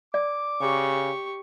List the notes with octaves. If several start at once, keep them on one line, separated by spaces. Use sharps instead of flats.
D5 D6
C#3 G4 C#6